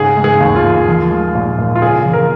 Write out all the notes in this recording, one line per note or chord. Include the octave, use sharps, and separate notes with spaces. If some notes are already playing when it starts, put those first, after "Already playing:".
Already playing: G#2 C#3 G#4
G#3
G#4
D#2
F4
D#2
F3
G#3
A#2
A#2
F4
C#3 G#4
F3
A#4